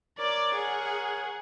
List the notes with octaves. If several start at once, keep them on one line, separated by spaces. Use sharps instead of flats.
A#4 C#5 D5 D6
G#4 F#5